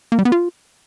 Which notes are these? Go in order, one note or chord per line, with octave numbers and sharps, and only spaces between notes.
A#3
G3
B3
F4